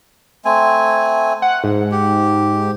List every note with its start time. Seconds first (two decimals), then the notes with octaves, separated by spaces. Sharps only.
0.45 A3 C4 G#5
1.42 F#5
1.64 G#2
1.92 G4